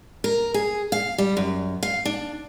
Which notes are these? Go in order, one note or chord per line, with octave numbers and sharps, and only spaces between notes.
A#4
G#4
F5
G3
F#2
F5
D4